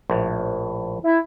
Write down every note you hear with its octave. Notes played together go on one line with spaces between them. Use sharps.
A#1 A2
E4